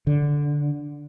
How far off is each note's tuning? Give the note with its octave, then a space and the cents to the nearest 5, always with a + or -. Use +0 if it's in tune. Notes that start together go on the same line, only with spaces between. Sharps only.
D3 -5